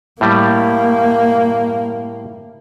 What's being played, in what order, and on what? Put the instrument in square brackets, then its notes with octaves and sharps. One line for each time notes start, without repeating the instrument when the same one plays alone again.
[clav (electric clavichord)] A2 G3 [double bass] A#3